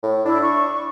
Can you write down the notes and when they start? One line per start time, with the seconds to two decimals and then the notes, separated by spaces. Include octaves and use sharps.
0.03 A2
0.26 D4 E4
0.42 C#6